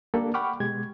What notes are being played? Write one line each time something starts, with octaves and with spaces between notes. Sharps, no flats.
A#3 D4 G4 A4 D5
F#5 G5 B5 C#6 D6 F6
B2 G#3 G4 G#6